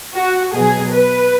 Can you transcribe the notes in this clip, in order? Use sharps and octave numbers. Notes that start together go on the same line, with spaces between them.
F#4
B2 F#3 G#4
B4